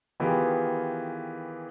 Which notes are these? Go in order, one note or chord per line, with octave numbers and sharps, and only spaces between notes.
D#3 E3 B3 F4 G4 G#4